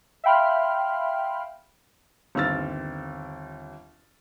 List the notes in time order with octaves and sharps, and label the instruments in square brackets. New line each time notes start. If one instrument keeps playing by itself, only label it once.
[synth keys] E5 F5 G5 B5 C6 F6
[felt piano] G1 D#2 C4 E6 F6 A6